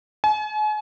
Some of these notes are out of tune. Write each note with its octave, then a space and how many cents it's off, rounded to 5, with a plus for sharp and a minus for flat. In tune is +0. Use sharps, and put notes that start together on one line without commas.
G#5 +40